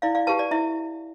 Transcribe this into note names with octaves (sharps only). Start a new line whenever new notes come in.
E4 D5 F5
D5 F5
G4 B4 F5 A5
D5
E4 E5